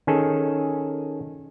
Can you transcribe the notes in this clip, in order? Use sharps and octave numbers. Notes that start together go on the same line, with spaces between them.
D#3 C#4 G#4 A4